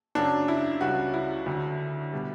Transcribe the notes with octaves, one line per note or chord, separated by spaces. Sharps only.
F#2 C#3 F#3 D4
E4
C#2 C#3 G3 F#4
E4
D2 D3 F#3
B2 G3